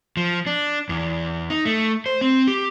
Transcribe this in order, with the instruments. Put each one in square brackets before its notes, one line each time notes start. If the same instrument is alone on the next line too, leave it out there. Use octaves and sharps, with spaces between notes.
[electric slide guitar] F3
D4
E2
D#4
A3
C5
C4
G4